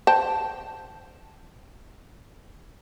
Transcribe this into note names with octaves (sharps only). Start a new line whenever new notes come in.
C5 G5 A5